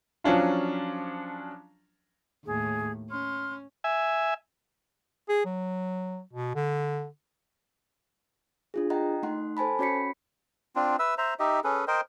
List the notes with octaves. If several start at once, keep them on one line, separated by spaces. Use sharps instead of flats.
F3 F#3 C#4 D4 F4
D#2 A2 G#4
C#4 C6 F6
E5 G#5
G#4
F#3
B2
D3
D4 F4 G#4
D#5 F#5 G5 A#5
A3 D#4 F#5 C6
A4 C5 G#5 A5 B5
C#4 F#4 C#5 B5 B6 C#7
C4 D4 F4
B4 E5 E6
C5 E5 A#5
D#4 G4 D#5 E5
C#4 G#4 A4 B4
A#4 C5 D#5 G5